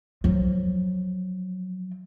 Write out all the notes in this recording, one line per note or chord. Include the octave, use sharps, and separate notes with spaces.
F3 F#3